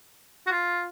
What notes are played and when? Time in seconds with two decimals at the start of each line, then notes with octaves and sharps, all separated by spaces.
0.47 F#4
0.51 F4